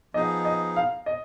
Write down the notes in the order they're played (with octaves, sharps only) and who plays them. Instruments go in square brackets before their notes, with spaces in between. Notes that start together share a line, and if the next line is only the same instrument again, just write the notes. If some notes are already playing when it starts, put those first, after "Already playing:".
[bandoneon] F3 B3 D#4 G#4 [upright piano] D#5
[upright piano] D#5
F5
D#5